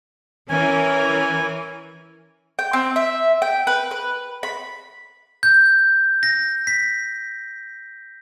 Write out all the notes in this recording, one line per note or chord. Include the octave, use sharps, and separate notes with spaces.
E3 C#4 A#4 G#5
G5
C4
E5
G5
B4
B4
B5
G6
A#6
B6